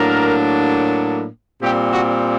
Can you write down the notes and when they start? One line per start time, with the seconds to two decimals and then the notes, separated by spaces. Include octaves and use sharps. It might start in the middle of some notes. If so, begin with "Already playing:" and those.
Already playing: A2 F#3 A#3 D4 A#4
1.61 A#2 G3 C4 G4
1.92 F#4